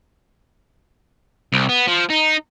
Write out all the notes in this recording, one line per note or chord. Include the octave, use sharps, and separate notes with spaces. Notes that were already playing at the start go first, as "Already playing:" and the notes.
C2
B3
F3
D#4